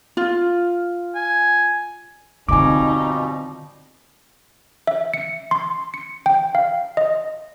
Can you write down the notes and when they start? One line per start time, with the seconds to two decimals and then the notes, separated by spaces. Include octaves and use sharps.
0.17 F4
1.15 G#5
2.49 B2 D3 F3 G3 C4 D#4 G#5 D6
4.87 E5
5.14 C#7
5.51 C6
5.94 C#7
6.26 G5
6.55 F5
6.97 D#5